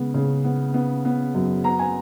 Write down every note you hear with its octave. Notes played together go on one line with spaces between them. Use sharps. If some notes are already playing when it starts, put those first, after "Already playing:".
Already playing: C#3 G#3 B3
C#3
B3
B3
B3
F#2
B3 A#5
G#5